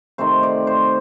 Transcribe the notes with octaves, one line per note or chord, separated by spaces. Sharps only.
C3 D#3 A3 C4 C5
D5
C5